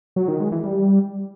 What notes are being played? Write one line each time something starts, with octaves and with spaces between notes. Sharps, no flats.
F#3
D#3
G#3
E3
G3